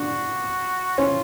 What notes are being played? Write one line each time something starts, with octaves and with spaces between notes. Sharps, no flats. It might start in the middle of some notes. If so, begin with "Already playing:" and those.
Already playing: D4 F#4
C#4 F4